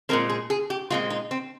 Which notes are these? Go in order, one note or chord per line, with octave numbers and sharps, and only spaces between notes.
A#2 G#3 C4 A#4
G#4
G#4
G4
A#2 G#3 C4 F4
D#4
C4